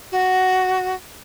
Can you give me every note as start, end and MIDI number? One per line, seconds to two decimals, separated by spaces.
0.11 0.94 66